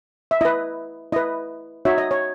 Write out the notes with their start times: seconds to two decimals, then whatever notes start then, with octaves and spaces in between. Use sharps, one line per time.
0.31 E5
0.41 E4 B4 D#5
1.12 E4 B4 D#5
1.85 D#4 F#4 C#5 E5
1.98 D#5
2.11 C#5